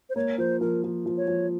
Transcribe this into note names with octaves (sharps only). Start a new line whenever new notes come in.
C5
A#3 C#5
F3 C5
F3 A#4
F3
F3
C#5
F3